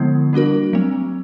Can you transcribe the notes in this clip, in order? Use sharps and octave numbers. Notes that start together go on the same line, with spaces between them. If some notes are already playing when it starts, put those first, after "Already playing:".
Already playing: D3 F3 G#3 B3 E4
G3 A#3 D4 F#4 A#4
F#3 A3 C4